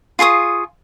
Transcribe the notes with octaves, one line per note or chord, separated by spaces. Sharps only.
F4 G#4 C#6 D#6